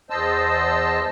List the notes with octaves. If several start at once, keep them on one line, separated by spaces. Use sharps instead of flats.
E2 C5 D#5 A5 E6